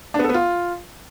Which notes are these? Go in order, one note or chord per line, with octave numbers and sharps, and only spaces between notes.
D4
B3
A4
B3
F4